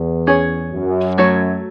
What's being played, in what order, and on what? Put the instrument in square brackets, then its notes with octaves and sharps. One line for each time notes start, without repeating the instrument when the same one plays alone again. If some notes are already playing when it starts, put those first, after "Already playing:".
Already playing: [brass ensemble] E2
[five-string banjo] C#4 G#4 C#5
[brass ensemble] F#2
[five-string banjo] F#3 A3 C#5